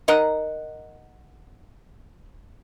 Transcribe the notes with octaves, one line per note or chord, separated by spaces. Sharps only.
D#4 A#4 D#5 F#5